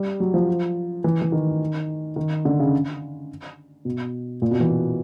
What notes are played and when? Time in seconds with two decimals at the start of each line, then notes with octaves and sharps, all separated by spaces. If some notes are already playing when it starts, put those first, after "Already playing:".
Already playing: G3
0.20 F#3
0.34 F3
1.04 E3
1.22 E3
1.32 D#3
2.16 D#3
2.45 D3
2.59 C#3
3.85 B2
4.42 A#2
4.51 B2
4.60 E3